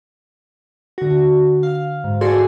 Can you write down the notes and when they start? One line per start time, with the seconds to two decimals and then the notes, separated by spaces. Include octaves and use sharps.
0.98 D3 F#4
1.63 F5
2.04 G#2
2.21 F#4 G#4 A4 D5 G#5 C6